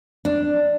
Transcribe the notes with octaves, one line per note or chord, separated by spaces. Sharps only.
D4